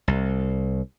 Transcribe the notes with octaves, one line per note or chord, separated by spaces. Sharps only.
C2